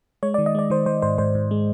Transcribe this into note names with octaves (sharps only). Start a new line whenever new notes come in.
G#3 C#5
D5
D#3
D#5
G#3 D5
D#3 C5
D#3 C5
G#2 C5
G#2 C5
G#2
G#3